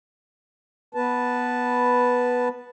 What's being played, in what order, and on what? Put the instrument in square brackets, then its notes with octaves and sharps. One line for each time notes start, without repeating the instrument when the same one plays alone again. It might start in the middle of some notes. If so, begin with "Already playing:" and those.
[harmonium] B3 B4 A5